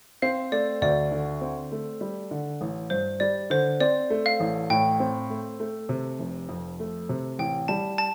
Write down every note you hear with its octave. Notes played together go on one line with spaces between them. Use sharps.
C4 F5
A3 D5
D2 D5
D3
C4
A3
G3
D3
A1
G2 C5
G3 D5
D3 C5
C4 D5
A3
F5
A1
A2 G5
C4
A3
A3
C3
F1
F2
A3
C3
A1 G5
G3 A5
A5